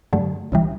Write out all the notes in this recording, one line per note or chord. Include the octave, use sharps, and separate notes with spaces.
G2 D3 F#3 A3
C#2 C#3 E3 G3